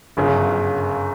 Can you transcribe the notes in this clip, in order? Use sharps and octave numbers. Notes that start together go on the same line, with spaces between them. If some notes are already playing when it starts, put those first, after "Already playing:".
G1 F#2 C#3